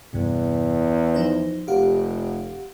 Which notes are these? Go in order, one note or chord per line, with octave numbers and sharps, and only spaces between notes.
E2 G2 C3
F3 D#4 C5
F1 G4 F5 F#5